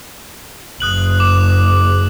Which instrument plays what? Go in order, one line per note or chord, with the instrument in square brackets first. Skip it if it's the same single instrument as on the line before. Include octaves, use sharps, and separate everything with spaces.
[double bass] F#1 [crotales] D#6 F#6 F#7
[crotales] D6 E7